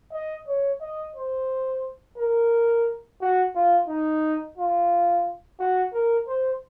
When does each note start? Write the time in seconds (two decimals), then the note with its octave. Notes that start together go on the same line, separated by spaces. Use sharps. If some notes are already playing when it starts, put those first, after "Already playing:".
0.13 D#5
0.48 C#5
0.81 D#5
1.16 C5
2.18 A#4
3.21 F#4
3.55 F4
3.88 D#4
4.58 F4
5.60 F#4
5.93 A#4
6.28 C5